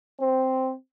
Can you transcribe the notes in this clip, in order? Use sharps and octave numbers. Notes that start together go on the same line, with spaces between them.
C4